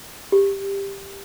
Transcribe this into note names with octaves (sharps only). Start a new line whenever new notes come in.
G4